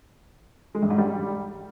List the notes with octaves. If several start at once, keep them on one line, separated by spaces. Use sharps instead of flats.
G#3
G2
G#2
G3